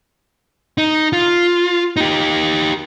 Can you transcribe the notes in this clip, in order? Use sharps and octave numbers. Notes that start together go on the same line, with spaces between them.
D#4
F4
D#4 G4